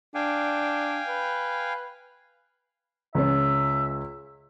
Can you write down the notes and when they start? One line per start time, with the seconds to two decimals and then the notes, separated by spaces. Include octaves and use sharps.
0.15 D4 F5 G5 G#5
1.08 B4
3.15 C#2 C#4 E5